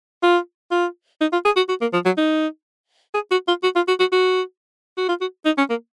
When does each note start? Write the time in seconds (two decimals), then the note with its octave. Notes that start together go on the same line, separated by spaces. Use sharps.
0.23 F4
0.71 F4
1.21 D#4
1.32 F4
1.45 G#4
1.56 F#4
1.69 F#4
1.81 A#3
1.93 F3
2.05 F#3
2.17 D#4
3.14 G#4
3.31 F#4
3.48 F4
3.63 F#4
3.76 F4
3.88 F#4
4.00 F#4
4.12 F#4
4.97 F#4
5.08 F4
5.21 F#4
5.45 D#4
5.58 C#4
5.70 A#3